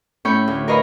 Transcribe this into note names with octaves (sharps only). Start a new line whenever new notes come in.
A2 C#4 C#5 B5 C#6 G6
D2
A#4 B4 C#5 D#5 F5 B5